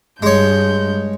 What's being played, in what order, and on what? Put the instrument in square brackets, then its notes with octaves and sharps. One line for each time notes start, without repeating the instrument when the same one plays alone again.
[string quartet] G2 G6 [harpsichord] G#3 C#5